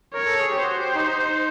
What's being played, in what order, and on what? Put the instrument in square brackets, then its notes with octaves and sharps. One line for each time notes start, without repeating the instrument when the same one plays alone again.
[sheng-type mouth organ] A#4 [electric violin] C#5
[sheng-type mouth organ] A4
G#4
G4
[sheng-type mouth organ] F#4 [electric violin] C5
[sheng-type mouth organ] G4
D#4
D#4